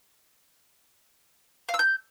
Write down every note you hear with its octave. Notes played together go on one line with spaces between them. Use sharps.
F5
E6
G6